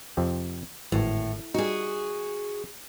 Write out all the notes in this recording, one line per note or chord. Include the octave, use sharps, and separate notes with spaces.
F2 C3 C4
G#1 A2 E3
G3 D#4 F#4 G#4